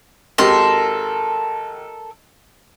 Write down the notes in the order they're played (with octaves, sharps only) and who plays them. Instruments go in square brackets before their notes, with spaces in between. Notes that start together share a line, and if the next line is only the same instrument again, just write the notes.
[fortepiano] G#1 G4 [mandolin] A4 A#4 C6